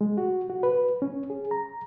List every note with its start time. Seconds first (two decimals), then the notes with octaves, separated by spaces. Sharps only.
0.01 G#3
0.17 F#4
0.50 F#4
0.63 B4
1.02 C#4
1.30 G#4
1.51 A#5